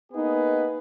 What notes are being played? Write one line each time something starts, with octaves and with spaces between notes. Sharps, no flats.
A#3 B3 D#4 G#4 B4